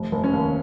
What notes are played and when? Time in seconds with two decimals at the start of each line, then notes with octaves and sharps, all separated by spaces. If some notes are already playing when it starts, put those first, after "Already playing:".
Already playing: F1
0.12 F1
0.24 C#4
0.33 D#2